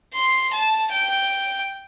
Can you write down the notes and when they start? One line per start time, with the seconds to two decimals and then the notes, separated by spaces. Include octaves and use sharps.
0.14 C6
0.53 A5
0.92 G5